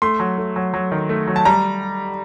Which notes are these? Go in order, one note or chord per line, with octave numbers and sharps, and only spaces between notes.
A3 C6
F#3
A3
F#3
F#3
D#3
A3
F#3
A5
G3 A#5